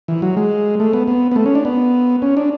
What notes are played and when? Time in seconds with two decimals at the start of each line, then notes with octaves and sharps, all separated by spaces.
0.08 E3
0.22 F#3
0.37 G#3
0.80 A3
0.93 B3
1.08 B3
1.32 B3
1.36 A3
1.46 C#4
1.55 D4
1.65 B3
2.22 C#4
2.37 D4